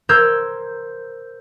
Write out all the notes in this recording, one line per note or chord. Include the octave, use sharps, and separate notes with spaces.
A#4 C5 E6 G6 G#6